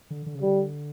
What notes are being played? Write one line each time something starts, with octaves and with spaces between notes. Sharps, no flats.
D3
D3
C#3
D3 G3